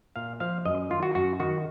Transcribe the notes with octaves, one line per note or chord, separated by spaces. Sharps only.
A#2 F5
F3 F5
F#2 D#5
D#3 F4
F#4
F#2 F#4
D#3 F#4